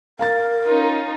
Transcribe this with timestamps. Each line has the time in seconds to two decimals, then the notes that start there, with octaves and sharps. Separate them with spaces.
0.19 A#4 F5 A#5 A6
0.64 C#4 D#4 F4